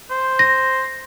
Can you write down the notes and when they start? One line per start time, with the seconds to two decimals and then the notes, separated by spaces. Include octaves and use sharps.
0.10 C5
0.39 A#6